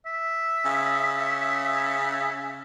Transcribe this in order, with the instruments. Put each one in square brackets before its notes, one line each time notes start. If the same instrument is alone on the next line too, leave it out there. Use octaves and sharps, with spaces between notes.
[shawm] E5
[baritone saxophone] C#3